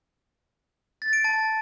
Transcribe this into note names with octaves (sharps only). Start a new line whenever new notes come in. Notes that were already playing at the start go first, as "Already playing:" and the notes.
A6
D7
A5